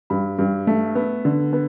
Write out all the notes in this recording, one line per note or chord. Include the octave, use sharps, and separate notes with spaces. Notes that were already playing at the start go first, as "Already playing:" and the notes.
G2 B5
G2
A3
B3
D3
B3